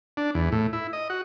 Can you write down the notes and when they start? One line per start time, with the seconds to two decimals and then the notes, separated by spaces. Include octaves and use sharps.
0.17 D4
0.35 E2
0.52 A2
0.73 E4
0.93 D#5
1.10 F#4